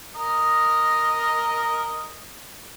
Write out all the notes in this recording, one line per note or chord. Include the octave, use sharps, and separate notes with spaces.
A#4 D#5 D#6